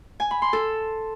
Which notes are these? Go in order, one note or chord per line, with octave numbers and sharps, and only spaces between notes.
G#5
B5
C6
A4